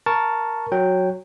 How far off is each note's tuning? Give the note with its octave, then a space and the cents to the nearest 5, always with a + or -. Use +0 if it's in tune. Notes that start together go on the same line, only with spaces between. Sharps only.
A#4 +0 A5 +0 C#6 +0
F#3 -5 G5 +0